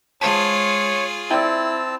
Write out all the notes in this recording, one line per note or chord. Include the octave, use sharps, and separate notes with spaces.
G#3 F4 G#4 C5 C#5 A5
C4 E4 D5 G5 A5 E6